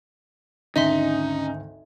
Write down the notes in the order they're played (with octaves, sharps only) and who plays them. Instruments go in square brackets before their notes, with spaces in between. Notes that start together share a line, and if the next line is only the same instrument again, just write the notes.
[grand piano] G#1 D2 G#5 [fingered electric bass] C#4 [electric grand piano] D#4 [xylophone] D#5 E5 C6